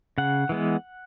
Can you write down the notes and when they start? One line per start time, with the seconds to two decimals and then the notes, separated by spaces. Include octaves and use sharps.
0.18 C#3 F#5
0.49 E3 G#3 B3